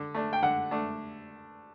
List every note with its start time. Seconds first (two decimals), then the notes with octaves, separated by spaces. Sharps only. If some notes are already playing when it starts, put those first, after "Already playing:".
Already playing: D3
0.14 A3 D4
0.33 G5
0.42 D3 F#5
0.71 A3 D4